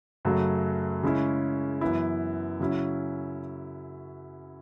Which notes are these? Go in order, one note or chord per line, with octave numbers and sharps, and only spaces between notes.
F#2 C#3 F#3 A3
C#3 G#3 C#4 E4
F#2 E3 B3 E4
C#3 F#3 C#4 E4